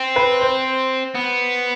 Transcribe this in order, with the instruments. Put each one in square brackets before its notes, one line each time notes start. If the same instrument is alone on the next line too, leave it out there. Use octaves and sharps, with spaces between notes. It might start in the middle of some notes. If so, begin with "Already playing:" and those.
Already playing: [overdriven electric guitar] C4
[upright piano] B4
C5
[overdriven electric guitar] B3